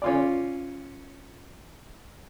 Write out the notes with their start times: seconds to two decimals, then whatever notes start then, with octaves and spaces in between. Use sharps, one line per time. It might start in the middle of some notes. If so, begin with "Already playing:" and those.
0.02 C#4 F4 D5